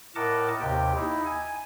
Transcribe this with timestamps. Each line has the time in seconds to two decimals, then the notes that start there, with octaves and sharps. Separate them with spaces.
0.15 A2 A#4 D#5 F#5 A5 D6
0.60 D#2 C3 G4 G5
0.96 D#4 E4
1.26 G#5